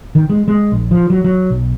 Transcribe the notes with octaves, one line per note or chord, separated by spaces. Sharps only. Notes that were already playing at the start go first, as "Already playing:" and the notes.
D#3
G#3
G#3
A#1
F3
F#3
F#3
B1